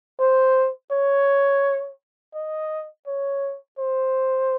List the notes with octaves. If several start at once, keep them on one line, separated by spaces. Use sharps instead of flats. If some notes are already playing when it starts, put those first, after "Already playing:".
C5
C#5
D#5
C#5
C5